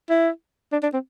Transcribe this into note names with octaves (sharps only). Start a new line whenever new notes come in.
E4
D4
D4
C4